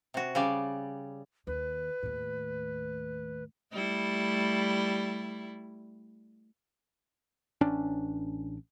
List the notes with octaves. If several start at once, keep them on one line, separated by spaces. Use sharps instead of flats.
C3 F#4
C#3 G3 D5
D#2 B4
D#2 A2
G3 A3 E4
A1 C#4 D4